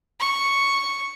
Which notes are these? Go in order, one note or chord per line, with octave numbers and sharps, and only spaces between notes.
C#6